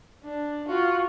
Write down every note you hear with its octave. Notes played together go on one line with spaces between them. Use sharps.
D4
F4 F#4